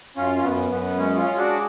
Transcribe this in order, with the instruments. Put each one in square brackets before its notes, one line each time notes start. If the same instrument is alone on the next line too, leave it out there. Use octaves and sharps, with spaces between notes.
[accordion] F#2 C#4 F4
C#4
F#2 B3
F#2 B3
G#3 C#4
C#4 F4
G#3
D4 F#4